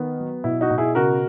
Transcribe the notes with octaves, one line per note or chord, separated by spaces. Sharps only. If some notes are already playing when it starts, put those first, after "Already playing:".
Already playing: D#3 B3
F#3
B2 E4
D#4 F#4
B2
E4 G#4
C#3 F#4 A#4